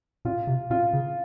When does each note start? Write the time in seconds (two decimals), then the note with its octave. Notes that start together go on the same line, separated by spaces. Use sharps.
0.25 A#2 F4
0.47 C3
0.70 A#2 F4
0.93 C#3